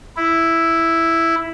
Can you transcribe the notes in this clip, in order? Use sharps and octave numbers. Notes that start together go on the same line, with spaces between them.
E4